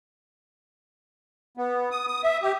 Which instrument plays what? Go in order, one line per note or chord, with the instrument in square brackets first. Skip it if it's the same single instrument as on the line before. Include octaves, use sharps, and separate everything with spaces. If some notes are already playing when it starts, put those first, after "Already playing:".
[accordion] B3
D#6
D#6
E5
G4